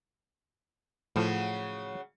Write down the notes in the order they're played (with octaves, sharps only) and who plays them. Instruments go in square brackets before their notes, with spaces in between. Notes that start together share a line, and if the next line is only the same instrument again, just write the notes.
[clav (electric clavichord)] A2 F3 A4 [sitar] C#3 F#3